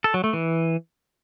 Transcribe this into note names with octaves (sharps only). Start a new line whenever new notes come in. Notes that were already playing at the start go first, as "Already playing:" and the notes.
A4
F#3
A3
E3